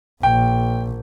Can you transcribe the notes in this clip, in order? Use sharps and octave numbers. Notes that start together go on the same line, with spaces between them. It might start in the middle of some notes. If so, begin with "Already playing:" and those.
A#1 G5